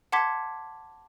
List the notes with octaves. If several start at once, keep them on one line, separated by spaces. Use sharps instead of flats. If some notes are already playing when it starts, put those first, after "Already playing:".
F#5 A5 C6 D6 G#6 B6